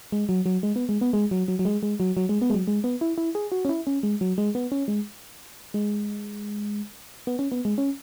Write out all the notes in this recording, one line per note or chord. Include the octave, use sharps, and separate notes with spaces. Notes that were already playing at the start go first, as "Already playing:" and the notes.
G#3
F#3
F#3
G#3
B3
G#3
B3
G#3
F#3
F#3
F#3
G#3
G#3
F#3
F#3
G#3
B3
G#3
F#3
G#3
B3
E4
E4
G#4
F#4
C#4
E4
C#4
G#3
F#3
G#3
B3
C#4
G#3
G#3
B3
C#4
B3
G#3
C#4